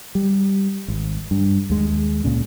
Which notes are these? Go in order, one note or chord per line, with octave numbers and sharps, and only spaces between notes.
G3
G#1
G2
D#2 G#3
C#2 A#2 C#3